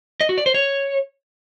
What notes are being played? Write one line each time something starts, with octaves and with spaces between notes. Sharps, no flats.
D#5
F#4
D5
C5
C#5